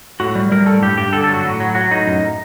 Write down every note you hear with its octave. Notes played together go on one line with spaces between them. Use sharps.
A2 F#4
G3
G3 A#4
A2 A4
G2 G4
G2 G4
D3 A4
A4
F#3
F#4
A2
F#3
F#3 F#4
A2 D#4
F#2